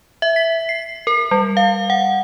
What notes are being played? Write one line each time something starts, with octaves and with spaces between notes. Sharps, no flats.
E5
B6
C7
A#4
G3
F5
F#5